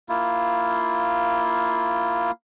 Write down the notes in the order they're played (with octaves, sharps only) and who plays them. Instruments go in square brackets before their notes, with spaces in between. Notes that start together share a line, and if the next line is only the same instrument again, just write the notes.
[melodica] A#3 E4 F4